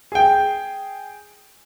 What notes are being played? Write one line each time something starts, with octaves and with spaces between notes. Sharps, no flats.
G#4 G5